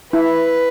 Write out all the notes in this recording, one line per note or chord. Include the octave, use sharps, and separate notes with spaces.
E4 B4